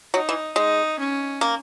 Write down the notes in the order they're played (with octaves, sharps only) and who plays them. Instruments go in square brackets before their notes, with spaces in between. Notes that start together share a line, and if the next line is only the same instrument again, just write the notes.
[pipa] F#3 [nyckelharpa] D#4
[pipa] E3
[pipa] G#3 [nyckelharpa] D#4
[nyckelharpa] C#4
[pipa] A#3